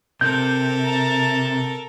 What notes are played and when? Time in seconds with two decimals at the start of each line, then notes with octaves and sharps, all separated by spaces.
0.21 C3 A4 A#4 G6
0.85 A5 A#5